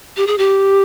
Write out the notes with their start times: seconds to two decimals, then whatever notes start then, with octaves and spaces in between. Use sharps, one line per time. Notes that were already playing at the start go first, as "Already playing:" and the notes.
0.17 G4
0.27 G#4
0.38 G4